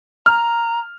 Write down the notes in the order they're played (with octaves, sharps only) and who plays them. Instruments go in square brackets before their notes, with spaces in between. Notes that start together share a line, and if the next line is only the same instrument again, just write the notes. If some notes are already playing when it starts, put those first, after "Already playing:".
[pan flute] A#5 [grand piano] F6